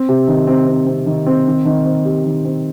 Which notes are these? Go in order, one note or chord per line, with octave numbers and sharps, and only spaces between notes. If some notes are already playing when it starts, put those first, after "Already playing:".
Already playing: C4
C3
D#3
C4
C4
C4
D#3
C4
D#3
D#3
C4
G4
D#3
C4